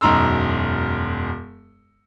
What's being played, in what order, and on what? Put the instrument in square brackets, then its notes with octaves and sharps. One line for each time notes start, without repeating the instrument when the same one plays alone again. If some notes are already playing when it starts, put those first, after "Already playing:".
[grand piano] E1 F#2 D#4 A#5 C6 E6